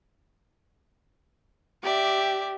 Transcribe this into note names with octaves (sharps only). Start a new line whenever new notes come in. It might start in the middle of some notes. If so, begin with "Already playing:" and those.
G4 D5 E5